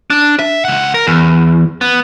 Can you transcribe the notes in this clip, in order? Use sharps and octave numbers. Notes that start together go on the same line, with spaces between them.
D4
E5
C#2 F#5
A#4
E2
B3